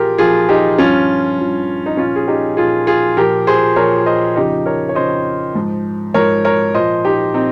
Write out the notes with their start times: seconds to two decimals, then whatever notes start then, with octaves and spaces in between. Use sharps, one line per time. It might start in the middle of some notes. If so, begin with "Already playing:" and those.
Already playing: A#2 F3 F4 G4 G#4 A#4
0.18 A#2 F3 F4 G#4
0.49 D#4 G4
0.78 G2 F3 C#4 F4
1.38 G2 F3
1.86 D#4
1.97 A#2 F3 C#4 F4
2.16 G#4
2.28 D#4 G4
2.57 A#2 F3 F4 G#4
2.87 F4 G#4
3.17 A#2 F3 G4 A#4
3.47 G#4 C5
3.76 A#2 F3 A#4 C#5
4.06 C5 D#5
4.36 F2 C#3 F3 D#4 G4
4.65 A#4 C#5
4.89 C#5
4.95 F2 C#3 F3 C5 D#5
5.55 G#2 F3
6.14 G#2 F3 A#4 C#5
6.45 A#4 C#5
6.74 A#2 F3 C5 D#5
7.05 D#4 G4
7.34 A#2 C4 D#4